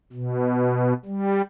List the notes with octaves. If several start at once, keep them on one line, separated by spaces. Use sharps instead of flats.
B2
G3